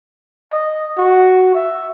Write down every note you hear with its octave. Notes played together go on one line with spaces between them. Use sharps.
D#5
F#4
E5